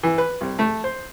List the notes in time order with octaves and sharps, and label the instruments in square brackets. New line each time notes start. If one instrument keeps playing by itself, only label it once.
[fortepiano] E3
B4
C2
A3
C5